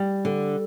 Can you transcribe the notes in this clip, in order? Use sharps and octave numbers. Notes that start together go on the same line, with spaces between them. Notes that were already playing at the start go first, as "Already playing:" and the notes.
Already playing: G3
D3